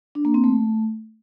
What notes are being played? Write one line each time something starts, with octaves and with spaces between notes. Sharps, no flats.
D4
A#3
C4
A3